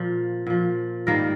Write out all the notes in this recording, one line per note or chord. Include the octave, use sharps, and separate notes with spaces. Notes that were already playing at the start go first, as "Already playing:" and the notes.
Already playing: A#2 F3
A#2 F3
G#2 D#3 G3 A#3 A#4